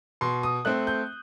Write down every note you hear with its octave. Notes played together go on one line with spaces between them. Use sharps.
B2 C6
D#6
A3 C4 F#6
G6